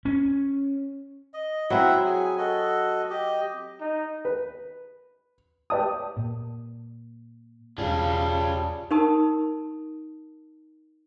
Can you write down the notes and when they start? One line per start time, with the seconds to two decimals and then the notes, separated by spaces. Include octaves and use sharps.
0.05 C#4
1.34 D#5
1.70 F#3 C4 E4 E5 F#5
2.06 G#4 G#5
2.38 F#4 A4 D#5
3.10 G4 D#5
3.80 D#4
4.25 B4
5.70 G4 B4 D5 A5 D#6
6.17 A#2
7.78 E1 C#3 G3 D4 F4 G#4 A5
8.91 D#4 A#4 A5 D#6